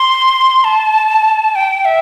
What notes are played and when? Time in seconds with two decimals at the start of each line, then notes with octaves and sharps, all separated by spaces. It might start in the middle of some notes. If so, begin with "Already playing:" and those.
Already playing: C6
0.64 A5
1.55 G5
1.85 E5